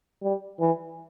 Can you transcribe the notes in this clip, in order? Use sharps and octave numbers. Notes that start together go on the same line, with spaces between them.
G3
E3